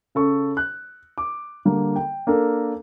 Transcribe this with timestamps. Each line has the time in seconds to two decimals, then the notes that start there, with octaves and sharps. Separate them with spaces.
0.15 C#3 A4 C#6
0.57 F#6
1.18 D6
1.65 D3 G3 A#3
1.96 G5
2.27 A#3 D4 A4 A#4